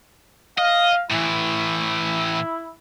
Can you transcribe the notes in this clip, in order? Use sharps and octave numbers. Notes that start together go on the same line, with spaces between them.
D#5 F5
A2 E3 E4